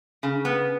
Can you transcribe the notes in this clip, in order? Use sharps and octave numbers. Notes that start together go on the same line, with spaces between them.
C#3
B3